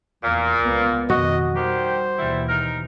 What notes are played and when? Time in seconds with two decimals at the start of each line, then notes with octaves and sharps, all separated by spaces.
0.24 E2 A#2
0.60 C#2 B3
1.10 F2 B2 D#3 F#4 D#5
1.56 D#3 G3 G4 C5
2.18 D#2 B2 E3 G3 E4
2.49 D#4 A#4